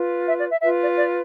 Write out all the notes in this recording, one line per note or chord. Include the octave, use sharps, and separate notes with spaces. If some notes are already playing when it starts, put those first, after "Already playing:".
Already playing: F4 B4
E5
D5
E5
F4 B4 E5
D5
D5